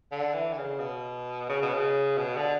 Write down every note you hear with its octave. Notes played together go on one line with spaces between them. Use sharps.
D3
E3
D3
C#3
B2
C#3
B2
C#3
B2
D3